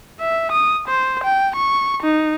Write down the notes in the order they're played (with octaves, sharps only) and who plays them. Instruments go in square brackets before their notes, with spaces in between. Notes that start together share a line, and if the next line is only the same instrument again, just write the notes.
[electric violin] E5
D#6
C5
G5
C#6
D#4